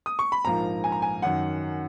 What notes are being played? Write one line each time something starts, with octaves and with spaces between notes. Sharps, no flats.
D#6
C#6
B5
A#1 G#2 F3 A#3 A#5
G#5
A#5
G#5
F#2 D#3 F#3 F#5